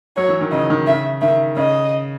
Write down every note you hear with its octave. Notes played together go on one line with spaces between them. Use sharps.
F#3 C#5
E3
D#3
C#3 D#5
D#3
C#3 E5
D#3 E5
C#3 D#5